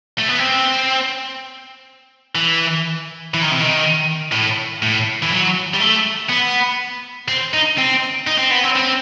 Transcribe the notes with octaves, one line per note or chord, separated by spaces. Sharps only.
A3
B3
C4
E3
E3
D#3
C3
D#3
A2
A2
E3
F#3
G3
A3
B3
C4
D#4
C4
D#4
C4
B3
C4
C4